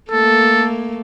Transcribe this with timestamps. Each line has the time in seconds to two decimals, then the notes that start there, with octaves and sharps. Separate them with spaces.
0.11 A3 A#3 A4